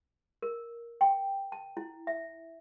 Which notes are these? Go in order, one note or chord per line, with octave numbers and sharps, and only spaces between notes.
A#4
G5
A5
E4
E5